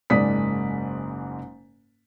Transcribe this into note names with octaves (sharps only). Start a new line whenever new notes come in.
F#1 G#2 G#3 D5 D#6 B6